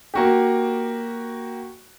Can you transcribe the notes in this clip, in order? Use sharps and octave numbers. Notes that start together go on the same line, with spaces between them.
A#3 F#4 G4